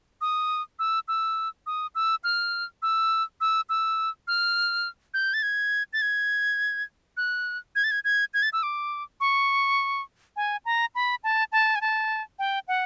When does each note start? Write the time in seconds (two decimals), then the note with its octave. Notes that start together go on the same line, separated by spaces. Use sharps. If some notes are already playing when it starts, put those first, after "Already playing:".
0.21 D#6
0.79 E6
1.08 E6
1.66 D#6
1.95 E6
2.24 F6
2.82 E6
3.41 E6
3.69 E6
4.28 F6
5.14 G6
5.34 A6
5.42 G#6
5.93 A6
6.02 G#6
7.17 F#6
7.75 G#6
7.84 A6
7.91 G#6
8.04 G#6
8.34 G#6
8.42 A6
8.53 E6
8.63 D6
9.20 C#6
10.36 G#5
10.65 A#5
10.95 B5
11.24 A5
11.52 A5
11.75 G#5
11.81 A5
12.39 G5
12.68 F#5